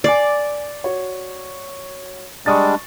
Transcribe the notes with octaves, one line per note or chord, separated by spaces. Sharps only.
D5 G#5 D6 C7
F#4 C#5
G3 G#3 D4 C#6 D#6 A6